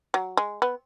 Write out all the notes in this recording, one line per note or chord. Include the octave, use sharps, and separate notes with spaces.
F#3
G#3
B3